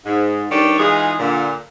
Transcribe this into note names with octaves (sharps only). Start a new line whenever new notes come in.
G#2
G2 D#3 G4 A4 C#5 D5
E3 G#3 D#4 F4 G#4
A#2 D3